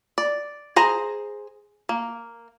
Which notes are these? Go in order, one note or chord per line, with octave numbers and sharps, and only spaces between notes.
D5
G#4 C5 A#5
A#3